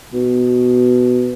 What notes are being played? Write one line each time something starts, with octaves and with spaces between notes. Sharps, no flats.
B2